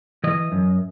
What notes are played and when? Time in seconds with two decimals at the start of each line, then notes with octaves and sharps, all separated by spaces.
0.24 E3 D#5
0.52 F#2